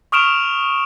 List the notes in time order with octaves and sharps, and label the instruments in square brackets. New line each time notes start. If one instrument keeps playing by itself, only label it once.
[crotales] C#6 D#6 F6 D7 E7 F7